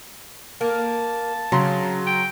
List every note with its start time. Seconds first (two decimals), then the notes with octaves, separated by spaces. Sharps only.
0.61 A#3 A5
1.52 C#3 F#3 A#5 C6
2.06 G5